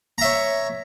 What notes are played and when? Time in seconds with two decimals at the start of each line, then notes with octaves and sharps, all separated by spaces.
0.18 A#5
0.21 E5
0.24 C#5